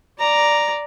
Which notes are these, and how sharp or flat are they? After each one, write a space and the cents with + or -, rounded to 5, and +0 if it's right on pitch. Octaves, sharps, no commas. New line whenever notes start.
D5 +0 A#5 +0